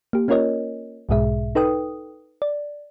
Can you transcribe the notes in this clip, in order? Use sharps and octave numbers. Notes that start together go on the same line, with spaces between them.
A#3 G4
A#3 C#4 F4 A#4 C#5 D#5
B1 G#2 B2 G#3 G#4 E5
D#4 A4 B4 G5 D#6
D5